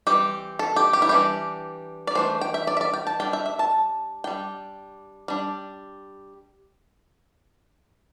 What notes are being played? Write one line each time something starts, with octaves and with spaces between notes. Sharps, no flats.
E3 G3 C4 G4
A4
G4
G4
E4
E3 G3 D4 G4
D5
E3 A3 D4 C5
G5
E5
D5
E5
D5
G5
A5
G3 D4 G5
E5
E5
A5
G3 D4 G5
G3 D4